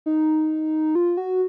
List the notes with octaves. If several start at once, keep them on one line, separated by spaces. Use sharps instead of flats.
D#4
F4
F#4